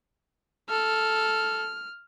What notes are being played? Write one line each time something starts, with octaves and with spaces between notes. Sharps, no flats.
A4 F6